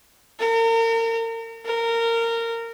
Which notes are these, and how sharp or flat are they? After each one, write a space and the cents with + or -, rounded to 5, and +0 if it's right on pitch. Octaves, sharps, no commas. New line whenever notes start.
A#4 -35
A#4 -20